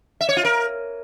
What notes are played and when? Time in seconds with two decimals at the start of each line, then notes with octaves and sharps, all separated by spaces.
0.21 E5
0.29 C#5
0.37 F4
0.45 A#4